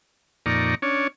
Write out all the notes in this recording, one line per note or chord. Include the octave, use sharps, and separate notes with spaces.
F2 A#2 D#4 D5 A#5 C#6
C#4 D4 C#5